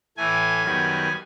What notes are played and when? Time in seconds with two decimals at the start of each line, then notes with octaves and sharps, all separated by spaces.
0.17 A2 E3 A3 G#5
0.62 F#2 D#3 G3 B3